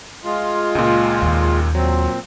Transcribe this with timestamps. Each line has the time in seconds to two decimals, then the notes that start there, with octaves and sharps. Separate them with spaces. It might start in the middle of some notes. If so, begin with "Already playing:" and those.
0.25 G#3 F4
0.75 C#2 A#2 C#3
1.22 D#2 A#3
1.75 A#2 F#3 C4